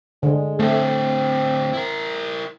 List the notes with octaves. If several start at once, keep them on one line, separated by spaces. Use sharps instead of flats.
D3 G#3
A2 D3 A3 C4
E4 A#4